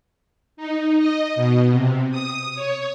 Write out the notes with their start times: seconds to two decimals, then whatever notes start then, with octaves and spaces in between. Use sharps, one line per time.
0.57 D#4
0.98 D#5
1.36 B2
1.72 C3
2.11 D#6
2.55 C#5